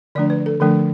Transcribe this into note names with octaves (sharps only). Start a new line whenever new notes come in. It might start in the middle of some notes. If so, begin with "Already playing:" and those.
D3 F3 A3 D4 D5
B4
A4
D3 F3 A3 D4 A4